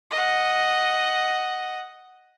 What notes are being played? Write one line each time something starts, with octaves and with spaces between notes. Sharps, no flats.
D#5 F#5